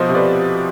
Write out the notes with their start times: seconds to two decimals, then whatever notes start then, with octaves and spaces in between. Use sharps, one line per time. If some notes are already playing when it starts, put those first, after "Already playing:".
Already playing: B2 F3 C5 D#5
0.09 C3
0.15 B4 D5